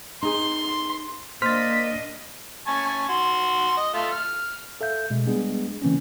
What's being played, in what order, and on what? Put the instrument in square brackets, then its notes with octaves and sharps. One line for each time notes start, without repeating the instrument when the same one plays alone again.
[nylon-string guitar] D#4 G#4 [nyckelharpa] C6
[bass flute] A#3 [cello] D4 D#5 [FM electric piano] C5 B6 [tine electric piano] F6 A6
[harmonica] G#5 A5 C#6
F#4 C6
D#5
A3 F4
F6
[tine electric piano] A4 E5 F5 G6
B2 G#3
G3 G#3 B3 D4 G#4
C#3 E3 A#3 C4 C#4